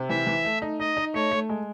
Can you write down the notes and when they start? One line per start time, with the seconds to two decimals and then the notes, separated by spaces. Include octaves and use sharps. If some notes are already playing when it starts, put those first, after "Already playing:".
Already playing: C3
0.09 E3 E5
0.27 E3
0.45 A3
0.62 D#4
0.80 D#4 D#5
0.97 D#4
1.14 A3 C#5
1.31 A3
1.49 G#3